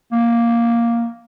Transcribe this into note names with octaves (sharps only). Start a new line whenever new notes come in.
A#3